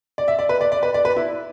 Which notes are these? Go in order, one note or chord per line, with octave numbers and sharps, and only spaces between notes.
D5
E5
D5
B4
D5
D5
B4
D5
B4
E4